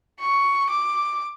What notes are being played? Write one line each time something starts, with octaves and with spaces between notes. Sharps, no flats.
C#6
D6